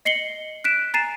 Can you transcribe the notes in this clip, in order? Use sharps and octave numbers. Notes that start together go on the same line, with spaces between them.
D#5 C7 C#7 F#7 G7
F#6 B6 D7 E7
G#5 A#5 A6 C7 D#7 E7